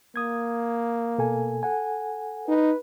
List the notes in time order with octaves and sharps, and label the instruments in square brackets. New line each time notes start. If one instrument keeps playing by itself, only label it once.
[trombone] A#3 [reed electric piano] D#6 G#6
[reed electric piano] B2 A4 G#5
A4 F#5 G#5
[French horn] D#4 [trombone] B4